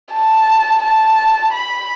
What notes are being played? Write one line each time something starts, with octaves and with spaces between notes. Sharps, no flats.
A5
A5
B5